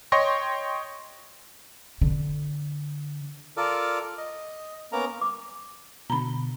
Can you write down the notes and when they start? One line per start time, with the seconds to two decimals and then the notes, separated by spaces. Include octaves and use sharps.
0.12 C#5 D#5 G5 C6 C#6 A#6
2.01 D3
3.57 F4 A4 A#4 D5
4.18 D#5
4.92 A#3 B3 C#4 A#4 A#5
5.21 D6
6.10 B2 D3 A#5 B5